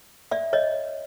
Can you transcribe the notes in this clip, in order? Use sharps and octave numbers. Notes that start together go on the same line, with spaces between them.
D5 E5
C#5 D#5